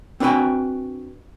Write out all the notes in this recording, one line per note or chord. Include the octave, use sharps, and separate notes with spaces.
C4 D4 F#4 B4 G5 G#5